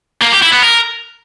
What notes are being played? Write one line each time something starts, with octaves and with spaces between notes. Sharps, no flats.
A#3
G4
E4
B3
A#4